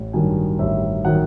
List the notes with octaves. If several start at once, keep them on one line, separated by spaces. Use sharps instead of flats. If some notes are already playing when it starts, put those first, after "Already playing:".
Already playing: A1
G2 D#3 F#3 G#5
A1 E5
D#3 F#3 F#5